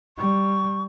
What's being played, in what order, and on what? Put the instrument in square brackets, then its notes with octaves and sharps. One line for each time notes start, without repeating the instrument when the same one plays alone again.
[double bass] G3 [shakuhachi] C#6